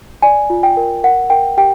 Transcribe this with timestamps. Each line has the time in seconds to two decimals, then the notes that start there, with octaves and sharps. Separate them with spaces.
0.22 D5 G#5
0.50 F4
0.63 G5
0.77 A#4
1.03 A#4 F#5
1.30 A#4 G5
1.57 G4 G5